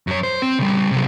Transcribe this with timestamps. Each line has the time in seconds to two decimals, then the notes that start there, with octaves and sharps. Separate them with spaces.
0.07 F#2 C#5
0.23 C5
0.42 C4
0.59 C#3 G3
0.91 C3 F#3